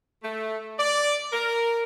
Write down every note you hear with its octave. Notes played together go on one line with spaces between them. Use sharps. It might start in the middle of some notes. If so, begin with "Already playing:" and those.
A3
D5
A#4